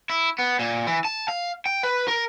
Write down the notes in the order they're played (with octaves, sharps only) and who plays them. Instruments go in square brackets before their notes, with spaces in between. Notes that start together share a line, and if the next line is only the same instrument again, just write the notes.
[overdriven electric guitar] E4
B3
A#2
E3
A5
F5
G5
B4
A#4